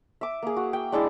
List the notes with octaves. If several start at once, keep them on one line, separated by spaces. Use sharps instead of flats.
E5 D6
A#3 G#4
F#4
G5
G#3 D4 E4 G#4